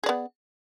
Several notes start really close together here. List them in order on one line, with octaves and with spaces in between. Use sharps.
G#4 D5 B3